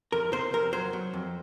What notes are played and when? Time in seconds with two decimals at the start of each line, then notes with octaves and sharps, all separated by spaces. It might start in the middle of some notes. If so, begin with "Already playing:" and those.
0.12 F2 A#4
0.32 C3 C5
0.53 F2 A#4
0.73 F#3 C5
0.93 F#3
1.13 F2